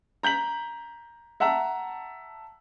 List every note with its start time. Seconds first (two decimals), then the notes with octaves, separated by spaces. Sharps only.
0.23 A#5 G6 B6 F#7
1.40 E5 F#5 A5 A#5 E6